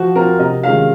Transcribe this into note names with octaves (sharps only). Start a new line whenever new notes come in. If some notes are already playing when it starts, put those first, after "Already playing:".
Already playing: F3 F#4
C4 F4 A#4
C3 D#5
D#3 G#3 C#4 F4 F5